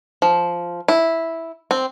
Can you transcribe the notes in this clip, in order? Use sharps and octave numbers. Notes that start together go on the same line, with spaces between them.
F3
E4
C4